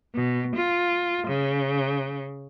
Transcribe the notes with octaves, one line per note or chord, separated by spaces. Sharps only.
B2
F4
C#3